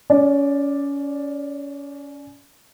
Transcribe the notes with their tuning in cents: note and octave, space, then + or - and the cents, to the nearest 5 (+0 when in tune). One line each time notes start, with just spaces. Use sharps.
C#4 +25 D5 +0